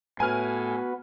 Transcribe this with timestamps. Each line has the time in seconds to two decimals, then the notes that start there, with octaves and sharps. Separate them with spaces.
0.20 A2 B3 F#4 B4 G#5 F6